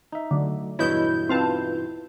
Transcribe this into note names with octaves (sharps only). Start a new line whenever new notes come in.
D#4 E5
D3 F#3 A3
E2 G2 B2 E4 C#5 D#5 G6
C4 D#4 F4 B4 F5 A5